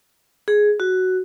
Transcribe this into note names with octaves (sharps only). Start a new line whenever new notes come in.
G#4
F#4